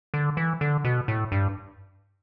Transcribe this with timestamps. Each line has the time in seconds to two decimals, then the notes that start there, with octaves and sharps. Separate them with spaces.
0.14 D3
0.37 E3
0.61 D3
0.84 B2
1.08 A2
1.32 G2